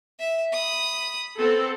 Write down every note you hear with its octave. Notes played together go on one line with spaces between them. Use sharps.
E5
B5 D#6
B3 C4 A4